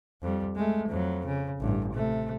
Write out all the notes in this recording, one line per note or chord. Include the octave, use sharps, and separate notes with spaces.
F2 G3
G#3 A3
F2 F#3
C#3
A1 G2
C3 A3